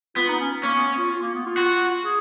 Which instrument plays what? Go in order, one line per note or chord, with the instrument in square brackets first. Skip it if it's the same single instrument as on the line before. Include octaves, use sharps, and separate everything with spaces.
[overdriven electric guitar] B3 [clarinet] F4
[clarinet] D#4
C#4
[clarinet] A#3 [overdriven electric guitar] C#4
[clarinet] B3
F4
F4
A#3
B3
F4
[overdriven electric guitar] F#4
[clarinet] G#4